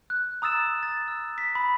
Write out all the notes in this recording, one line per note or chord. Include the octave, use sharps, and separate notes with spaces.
F#6
A#5 D#6 E6 A6 E7
A6
E6
B6
B5